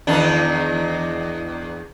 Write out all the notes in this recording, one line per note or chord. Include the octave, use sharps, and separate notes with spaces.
E2 D#3 D4